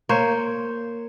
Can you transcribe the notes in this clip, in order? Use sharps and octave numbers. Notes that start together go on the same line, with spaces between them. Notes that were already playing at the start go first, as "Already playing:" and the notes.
A#3 C5 C#5